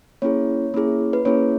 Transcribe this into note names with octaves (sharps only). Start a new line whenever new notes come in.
A#3 C#4 E4 G#4 C#5
A#3 C#4 E4 G#4
B4
A#3 C#4 E4 G#4 C#5